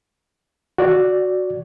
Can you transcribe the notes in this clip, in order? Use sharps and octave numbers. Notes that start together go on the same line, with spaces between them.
F#4 D5